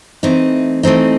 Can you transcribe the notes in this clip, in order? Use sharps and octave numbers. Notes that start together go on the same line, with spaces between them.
E3 A3 C4 D#4
E3 A3 C4 D#4